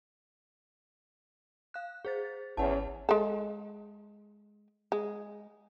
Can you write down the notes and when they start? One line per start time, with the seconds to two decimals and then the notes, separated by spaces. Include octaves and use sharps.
1.74 F5 F#6
2.05 G#4 C5 A6
2.57 G#1 E2 C#4 F#5 A5
3.09 G#3 A4
4.92 G#3